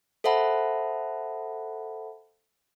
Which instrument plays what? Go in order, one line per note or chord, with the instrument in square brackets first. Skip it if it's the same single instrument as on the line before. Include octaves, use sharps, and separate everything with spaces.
[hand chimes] A4 C5 E5 F#5 A5 B5